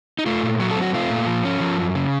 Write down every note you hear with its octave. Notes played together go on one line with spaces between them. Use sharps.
D#4
A3 F4
A#2
F#3 F#4
A4
C4
F#4
A3 F4
A#2
F3
C#4
F3
F#2
C#3